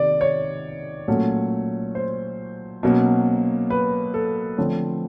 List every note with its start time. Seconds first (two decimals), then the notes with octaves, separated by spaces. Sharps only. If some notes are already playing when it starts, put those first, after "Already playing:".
Already playing: C3 D#3 D5
0.21 C#5
1.08 A#2 F#3 A3 C#4
1.95 C5
2.83 B2 F#3 A#3 C#4
3.70 B4
4.14 A4
4.58 D3 F3 A3 C4 C#5